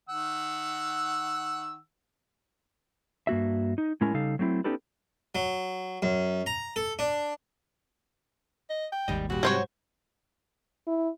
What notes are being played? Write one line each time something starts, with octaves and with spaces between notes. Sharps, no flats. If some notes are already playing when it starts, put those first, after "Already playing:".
D#3 F#5 E6
G2 A#3 F#4 E5
D#4
A2 G#3 C#4 E4 A#4 G#5
C#3 G3 D#4 A4 F5
F#3 A3 C4 D#4 E4
B3 C#4 D#4 G4 A4 B4
F#3
F#2
A#5
A4
D4
D#5
G5
G#1 D#2 G#2 G3 D#5
A#2 G3 F#4
G#2 C3 F#3 G3 C5 C#5
E4